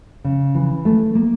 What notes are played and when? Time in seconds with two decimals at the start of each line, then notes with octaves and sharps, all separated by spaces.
0.24 C#3
0.54 E3
0.85 A3
1.15 A#3